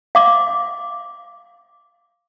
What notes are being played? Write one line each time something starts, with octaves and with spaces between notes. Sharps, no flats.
F5 D6